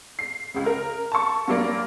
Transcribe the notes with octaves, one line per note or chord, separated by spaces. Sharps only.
C7
C#2 C#3
A#4
A5 C#6
G2 F#3 A#3 D5